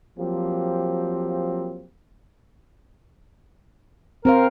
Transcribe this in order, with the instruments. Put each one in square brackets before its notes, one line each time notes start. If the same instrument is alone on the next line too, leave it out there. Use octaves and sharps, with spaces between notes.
[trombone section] F3 F#3 A#3 C4 G4
[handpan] C4 C5 F5 [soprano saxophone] A#4